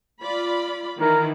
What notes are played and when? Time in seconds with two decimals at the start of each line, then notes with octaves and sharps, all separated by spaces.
0.23 F4 D5 B5
1.00 D#3 E3 E4 A#4